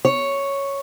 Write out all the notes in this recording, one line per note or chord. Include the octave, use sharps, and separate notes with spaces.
C#5